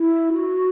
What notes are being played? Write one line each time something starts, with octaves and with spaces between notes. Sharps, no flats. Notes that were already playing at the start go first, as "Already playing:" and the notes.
Already playing: E4
F#4